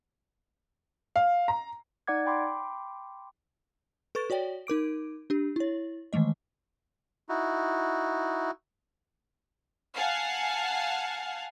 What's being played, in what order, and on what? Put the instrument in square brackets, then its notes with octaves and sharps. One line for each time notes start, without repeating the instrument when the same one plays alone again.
[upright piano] F5
A#5
[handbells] D#4 D5 F#5 D6 G#6
G5 B5 C6 D6
[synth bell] A4 B4 C#6 A6
F#4 C#5 D5 G5
D#4 A#4 D6 D7
D4 G4
E4 C#5
D#3 E3 G#3 A3 D#5
[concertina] D#4 E4 F#4
[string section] F5 F#5 G#5 A5